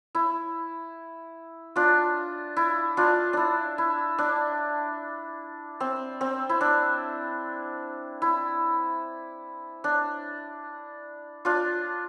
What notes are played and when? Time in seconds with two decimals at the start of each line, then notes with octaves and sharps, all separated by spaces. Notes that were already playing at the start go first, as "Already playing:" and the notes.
0.15 E4
1.76 D4 F4
2.57 E4
2.97 D4 F4
3.33 D4 E4
3.78 E4
4.18 D4
5.80 C4
6.21 C4
6.49 E4
6.61 D4
8.22 E4
9.84 D4
11.45 D4 F4